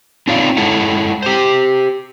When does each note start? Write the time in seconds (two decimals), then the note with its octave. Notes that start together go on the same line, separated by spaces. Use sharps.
0.28 C4 D#4 F4 C#5 D5 F5
0.57 G#3 E4 A4 C#5 F#5
1.23 G4 C5